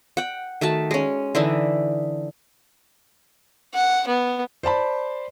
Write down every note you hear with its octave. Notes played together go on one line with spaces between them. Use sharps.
F#5 G5
D#3 A3 F#4 A5
G#3 C#4
D3 E3 D4 D#4
F#5
B3
C5 D5 A5 B5